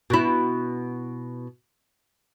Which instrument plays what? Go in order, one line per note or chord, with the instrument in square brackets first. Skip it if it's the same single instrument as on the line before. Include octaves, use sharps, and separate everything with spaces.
[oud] B2 E4